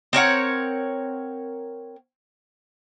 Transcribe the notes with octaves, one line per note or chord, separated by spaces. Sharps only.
C4 A#4 C#5 F#5